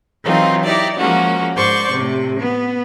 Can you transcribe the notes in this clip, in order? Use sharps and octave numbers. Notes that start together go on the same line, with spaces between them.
E3 F#3 C4 D#4 F4
D#4 E4 G4 D5
F3 G#3 A#3 C#4 F#4
G#2 C5 D5 C#6 G6
A2 C3
B3